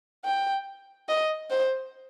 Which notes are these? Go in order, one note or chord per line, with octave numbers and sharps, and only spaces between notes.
G5
D#5
C5